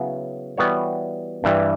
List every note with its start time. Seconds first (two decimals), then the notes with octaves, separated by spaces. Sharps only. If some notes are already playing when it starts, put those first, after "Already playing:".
Already playing: C#3 F#3 B3 E4
0.57 E3 G3 B3 F#4 C#5
1.44 G2 E3 G3